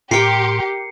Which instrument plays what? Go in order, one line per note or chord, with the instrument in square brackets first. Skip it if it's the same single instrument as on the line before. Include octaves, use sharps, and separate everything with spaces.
[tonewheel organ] A2 C6 [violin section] G4 [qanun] A#4 G5 [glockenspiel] C7 C#7